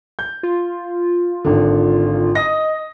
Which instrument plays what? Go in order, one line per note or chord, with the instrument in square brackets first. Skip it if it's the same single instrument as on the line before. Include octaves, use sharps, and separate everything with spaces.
[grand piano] G6
[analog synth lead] F4
[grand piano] G#1 D3
[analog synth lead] D#5 [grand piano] D#6 A#6